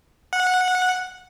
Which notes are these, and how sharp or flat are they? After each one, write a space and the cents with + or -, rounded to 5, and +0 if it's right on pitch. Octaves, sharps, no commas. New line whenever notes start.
F#5 -15